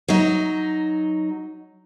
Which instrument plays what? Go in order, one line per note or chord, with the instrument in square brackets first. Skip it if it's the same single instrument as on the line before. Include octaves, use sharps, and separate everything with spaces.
[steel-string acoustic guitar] F#3 D#4